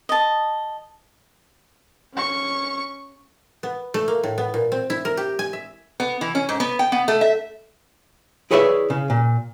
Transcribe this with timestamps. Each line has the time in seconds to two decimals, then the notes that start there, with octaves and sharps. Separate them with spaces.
0.09 D#5 A5
2.13 C#4 C#6
3.63 B3
3.94 A3
4.08 A#3
4.24 A2
4.38 B3
4.54 A#2
4.72 C4
4.90 E4
5.05 A#4
5.17 G4
5.39 G#5
5.53 E5
6.00 B3
6.21 E3
6.35 C#4
6.49 G#2
6.60 B3
6.79 G5
6.92 B3
7.08 A3
7.21 E5
8.51 E4 G#4 B4 C#5 D5 E5
8.90 C#3
9.10 A#2